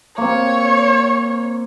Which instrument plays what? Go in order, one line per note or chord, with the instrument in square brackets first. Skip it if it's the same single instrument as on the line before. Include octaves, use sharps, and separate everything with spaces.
[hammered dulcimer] A#3 C4 [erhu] C#5